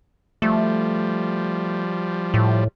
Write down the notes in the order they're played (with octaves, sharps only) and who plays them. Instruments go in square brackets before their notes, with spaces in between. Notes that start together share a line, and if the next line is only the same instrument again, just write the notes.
[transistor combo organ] F3 G3 [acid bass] A3
[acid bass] A2